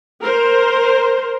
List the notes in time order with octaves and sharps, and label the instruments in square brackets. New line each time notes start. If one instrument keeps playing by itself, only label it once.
[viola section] A#4 C5